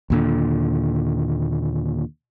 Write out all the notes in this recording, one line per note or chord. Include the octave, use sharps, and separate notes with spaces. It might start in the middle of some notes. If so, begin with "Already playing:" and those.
D#2 A#2 D3